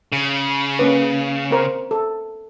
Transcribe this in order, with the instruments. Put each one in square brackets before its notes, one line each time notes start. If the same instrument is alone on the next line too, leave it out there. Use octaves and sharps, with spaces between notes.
[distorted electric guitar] C#3
[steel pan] A#3 C#4 B4
C4 A#4 C5
A4